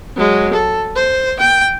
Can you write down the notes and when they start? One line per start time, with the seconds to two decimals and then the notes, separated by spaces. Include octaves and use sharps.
0.16 F#3 G#3
0.53 A4
0.96 C5
1.40 G5